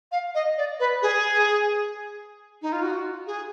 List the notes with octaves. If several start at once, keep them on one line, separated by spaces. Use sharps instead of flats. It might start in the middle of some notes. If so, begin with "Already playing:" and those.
F5
D#5
D5
B4
G#4
D#4
F4
F#4
G#4